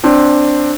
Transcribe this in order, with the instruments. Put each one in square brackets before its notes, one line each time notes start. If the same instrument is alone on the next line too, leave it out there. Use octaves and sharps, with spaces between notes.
[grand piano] C4 D4